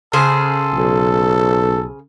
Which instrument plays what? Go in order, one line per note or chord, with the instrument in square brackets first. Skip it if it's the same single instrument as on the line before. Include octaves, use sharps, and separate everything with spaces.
[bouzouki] C#3 G#4 C5 [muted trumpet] A4
[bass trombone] B1